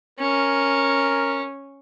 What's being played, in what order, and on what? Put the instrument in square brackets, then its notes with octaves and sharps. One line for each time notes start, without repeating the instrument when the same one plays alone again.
[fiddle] C#4 [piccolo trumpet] A#4